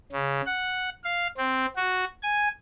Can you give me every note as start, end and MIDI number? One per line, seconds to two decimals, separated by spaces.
0.12 0.41 49
0.46 0.89 78
1.04 1.27 77
1.37 1.66 60
1.76 2.05 66
2.23 2.48 80